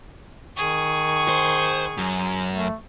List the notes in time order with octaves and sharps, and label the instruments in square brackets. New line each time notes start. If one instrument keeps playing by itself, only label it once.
[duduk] D#3 [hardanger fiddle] G#4 C#6
[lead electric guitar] C5
F#2
[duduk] A3